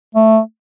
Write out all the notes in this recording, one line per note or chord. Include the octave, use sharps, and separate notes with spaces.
A3